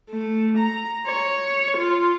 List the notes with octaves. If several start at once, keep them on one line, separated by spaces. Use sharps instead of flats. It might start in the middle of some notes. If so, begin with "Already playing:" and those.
A3
A#5
C#5
F4